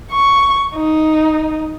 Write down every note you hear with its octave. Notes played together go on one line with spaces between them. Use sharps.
C#6
D#4